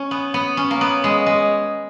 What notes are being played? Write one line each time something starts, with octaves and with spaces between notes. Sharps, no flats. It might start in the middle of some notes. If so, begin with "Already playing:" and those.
Already playing: C#4
B3
B3
C#4
A#3
B3
G#3
G#3